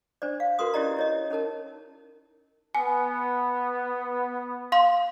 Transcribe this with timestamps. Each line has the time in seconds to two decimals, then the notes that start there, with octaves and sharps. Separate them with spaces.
0.22 D4 C5 D5
0.40 F5
0.59 F#4 A#4 B4 C6 D#6
0.74 C#4 E4 G4 D5 D#5 A#5
0.97 E4 C#5 D#5
1.30 C#4 D#4 A#4 A5
2.75 B3 G#5
4.72 F5 C6